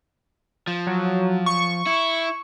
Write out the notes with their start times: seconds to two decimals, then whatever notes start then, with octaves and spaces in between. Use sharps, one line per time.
0.67 F3
0.87 F#3
1.46 C#6
1.86 E4